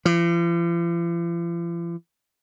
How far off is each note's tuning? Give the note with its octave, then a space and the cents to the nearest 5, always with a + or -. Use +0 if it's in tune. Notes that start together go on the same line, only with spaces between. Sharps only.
F3 -45